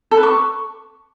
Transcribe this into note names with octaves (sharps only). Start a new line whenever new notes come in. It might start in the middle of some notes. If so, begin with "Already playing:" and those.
A4
B4
C#6